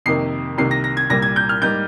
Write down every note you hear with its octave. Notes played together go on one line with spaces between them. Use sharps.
F2 C3 D#3 A#3 C7
C2 C3 D#3 A#3 C7
A#6
A#6
G#6
C2 A#2 G3 A#3 A#6
G#6
G6
F6
G#2 G3 A#3 G6